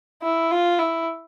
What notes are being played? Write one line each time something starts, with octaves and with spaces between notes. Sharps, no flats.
E4
F4
E4